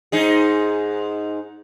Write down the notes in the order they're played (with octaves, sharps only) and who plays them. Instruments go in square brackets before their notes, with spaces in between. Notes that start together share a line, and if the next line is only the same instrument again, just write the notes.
[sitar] G#2 D#4 G#4